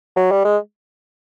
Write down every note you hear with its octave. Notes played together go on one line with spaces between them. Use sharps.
F#3
G3
G#3